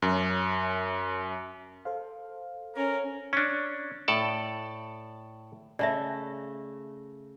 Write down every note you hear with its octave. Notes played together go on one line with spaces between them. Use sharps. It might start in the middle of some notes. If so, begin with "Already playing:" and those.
F#2
A4 C5 F5
C#4 A#4
C#4 D4
A2 A4 D5 A5
C#3 A3 D5 E5